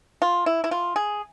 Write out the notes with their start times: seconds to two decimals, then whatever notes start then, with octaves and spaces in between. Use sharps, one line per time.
0.22 F4
0.46 E4
0.64 E4
0.71 F4
0.96 G#4